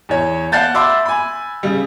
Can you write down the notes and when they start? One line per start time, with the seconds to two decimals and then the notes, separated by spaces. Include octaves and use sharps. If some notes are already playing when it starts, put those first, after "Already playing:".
0.09 E2 C#5
0.52 D5 F5 F#5 A5 G6 A6
0.74 E5 B5 C6 D6 E6
1.06 G#5 B5
1.63 C#3 G3